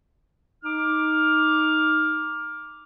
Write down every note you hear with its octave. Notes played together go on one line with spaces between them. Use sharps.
D#4 D6 F6